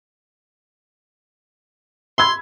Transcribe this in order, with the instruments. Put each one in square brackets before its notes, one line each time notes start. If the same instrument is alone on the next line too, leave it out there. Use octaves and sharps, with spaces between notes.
[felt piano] B5 E6 G#6 [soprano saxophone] C6